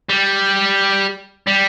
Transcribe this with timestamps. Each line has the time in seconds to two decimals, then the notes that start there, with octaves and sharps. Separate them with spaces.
0.09 G3
1.47 G3